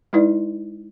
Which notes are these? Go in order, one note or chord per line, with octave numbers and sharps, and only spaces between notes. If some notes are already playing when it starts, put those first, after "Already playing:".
G#3 D#4 E4 B4 D5